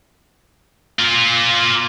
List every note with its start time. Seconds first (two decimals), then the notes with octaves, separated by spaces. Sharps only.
0.99 A#3 F4